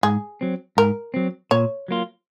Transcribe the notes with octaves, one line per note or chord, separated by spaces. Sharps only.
G#2 G#4
F#3 C4
G#2 A#4
F#3 C4
A#2 C#5
F#3 A#3 F4